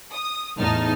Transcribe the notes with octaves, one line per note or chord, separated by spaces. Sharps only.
D#6
E2 A2 D#4 A5 F6